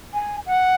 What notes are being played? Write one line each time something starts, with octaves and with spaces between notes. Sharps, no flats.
G#5
F#5